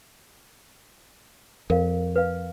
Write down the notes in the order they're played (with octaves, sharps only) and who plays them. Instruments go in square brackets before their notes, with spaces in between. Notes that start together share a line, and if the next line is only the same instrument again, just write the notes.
[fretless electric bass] F2 [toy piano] A#4 F5
[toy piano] B4 F5